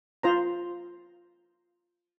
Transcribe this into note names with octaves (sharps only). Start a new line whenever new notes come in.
F4 C5 A#5